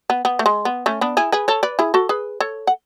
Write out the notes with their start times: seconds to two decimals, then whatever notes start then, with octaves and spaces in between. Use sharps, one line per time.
0.10 B3
0.25 B3
0.39 A3
0.46 G#3
0.65 B3
0.86 A3 C#4
1.01 B3 D4
1.17 E4 G#4
1.32 G#4 B4
1.48 A4 C#5
1.63 B4 D5
1.79 E4 G#4
1.94 F#4 A4
2.09 G#4 B4
2.40 A4 C#5
2.67 F#5